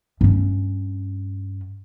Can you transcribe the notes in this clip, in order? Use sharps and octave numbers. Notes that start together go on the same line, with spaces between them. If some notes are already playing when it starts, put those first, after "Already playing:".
G2 C#4